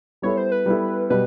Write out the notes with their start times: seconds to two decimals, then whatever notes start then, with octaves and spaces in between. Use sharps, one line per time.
0.22 G3 B3 E4 A4 C#5
0.37 C5
0.52 B4
0.66 G3 B3 E4 A4
1.10 B2 G3 B4